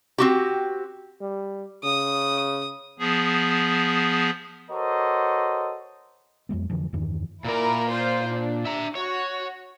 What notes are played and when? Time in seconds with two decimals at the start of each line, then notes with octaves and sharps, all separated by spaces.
0.18 C4 F#4 G4
1.21 G3
1.84 C#3 D#6
2.99 F3 B3 G#4
4.71 F#4 A4 A#4 C5 C#5 D#5
6.49 F2 F#3 G#3 B3
6.70 F2 D3 E3 F3
6.93 E2 G2 D#3 E3
7.45 A#2 E4 A#4 D5
7.90 F4 C5
8.33 D4
8.65 E5 A#5
8.95 F#4 C#5